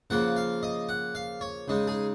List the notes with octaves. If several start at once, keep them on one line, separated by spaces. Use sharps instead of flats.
C#3 F3 A#3 F#5
F5
D#5
F#5
F5
C#5
C#3 G#3 D#4
G#4